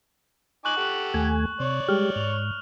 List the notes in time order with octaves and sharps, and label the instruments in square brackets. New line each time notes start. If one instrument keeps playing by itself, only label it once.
[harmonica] D#4 G#5 D6 [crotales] C#6 F#6 F#7
[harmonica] G4 A4 F#5
[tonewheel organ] D#2 A3 G#5
[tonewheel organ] C3 [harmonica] C#5 D5
[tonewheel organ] G3 G#3 G4 [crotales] F6
[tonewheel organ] G#2 [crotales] F7